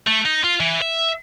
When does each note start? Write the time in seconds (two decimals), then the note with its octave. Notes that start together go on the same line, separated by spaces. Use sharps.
0.07 A3
0.25 D#4
0.44 F4
0.60 E3
0.82 E5